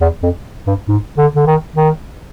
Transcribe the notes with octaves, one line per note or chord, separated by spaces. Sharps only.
E2
F2
G2
G#2
D3
D3
D#3
D#3